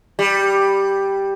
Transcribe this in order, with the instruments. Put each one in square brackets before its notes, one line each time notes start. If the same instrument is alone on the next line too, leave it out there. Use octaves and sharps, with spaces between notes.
[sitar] G3